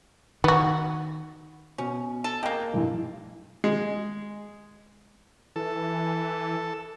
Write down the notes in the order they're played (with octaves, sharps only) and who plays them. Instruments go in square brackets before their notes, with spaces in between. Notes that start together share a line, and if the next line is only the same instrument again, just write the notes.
[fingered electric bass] D#3 [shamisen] B3 F#4
[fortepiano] B2 [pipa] C#4
[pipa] A4
[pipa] G#3 A#3 [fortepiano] G5
[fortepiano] B1 G2 E3
G#3
[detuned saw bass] E3 [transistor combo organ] A4